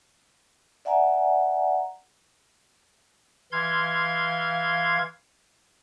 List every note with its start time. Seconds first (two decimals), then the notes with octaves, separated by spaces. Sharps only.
0.85 D5 E5 F#5 G#5 A#5
3.52 E3 F5 C6 G#6